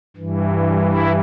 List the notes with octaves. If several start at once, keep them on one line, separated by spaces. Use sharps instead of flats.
G2 E3
E4